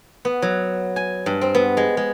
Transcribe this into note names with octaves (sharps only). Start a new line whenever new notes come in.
B3
F#3
G#5
G2
C4
B3
G#3
G#3